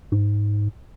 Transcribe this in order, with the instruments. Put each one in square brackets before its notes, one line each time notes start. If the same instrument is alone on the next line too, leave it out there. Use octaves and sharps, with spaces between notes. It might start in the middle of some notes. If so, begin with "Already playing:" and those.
[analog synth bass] G#2